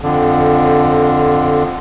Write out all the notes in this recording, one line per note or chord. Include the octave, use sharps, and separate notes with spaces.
F2 D3